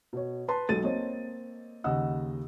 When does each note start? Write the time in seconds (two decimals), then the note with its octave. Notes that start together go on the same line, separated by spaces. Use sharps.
0.13 B2 C#5
0.48 B4 A5 C6
0.69 B1 G#3 A4 A6 D#7
0.84 A#3 C4 C#5 D#5
1.84 D#2 C#3 D#5 F#5 E6